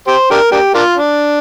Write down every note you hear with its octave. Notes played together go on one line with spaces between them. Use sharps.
G4 C5
D4 G4 A#4
A#3 D4 G4
A#3 D4 F4
D4